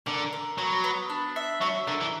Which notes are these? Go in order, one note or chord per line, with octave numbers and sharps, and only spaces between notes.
D3 A#4
A#4
F#3 B3
B3
D4
E5
F#3 E5
D3 A#4
E3